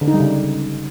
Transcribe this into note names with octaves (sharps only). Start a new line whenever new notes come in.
D3
D#4
G3
C#3